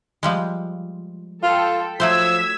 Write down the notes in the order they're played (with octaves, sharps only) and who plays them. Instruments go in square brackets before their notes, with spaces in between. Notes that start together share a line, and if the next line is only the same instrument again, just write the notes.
[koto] F3 G3 G#3
[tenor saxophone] F4 [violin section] A4 G5
[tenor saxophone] F3 [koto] F#3 A3 C5 [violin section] E6 G#6 B6